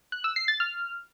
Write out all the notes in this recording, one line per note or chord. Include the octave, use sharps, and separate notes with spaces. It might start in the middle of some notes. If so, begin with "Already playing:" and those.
F#6
E6
C7
A6
F6